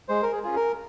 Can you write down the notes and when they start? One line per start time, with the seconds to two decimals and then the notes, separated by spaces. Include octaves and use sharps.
0.08 G#3 C5
0.23 A#4
0.33 G#4
0.43 C#4 F4 G#4
0.56 A#4